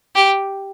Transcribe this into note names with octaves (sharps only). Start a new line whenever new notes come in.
G4